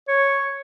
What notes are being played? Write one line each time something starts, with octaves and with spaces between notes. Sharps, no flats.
C#5